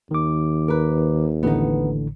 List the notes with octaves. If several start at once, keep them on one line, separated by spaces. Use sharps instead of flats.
D#2 D#3 D6
A#4 B4
A1 A2 D3 B3 D#4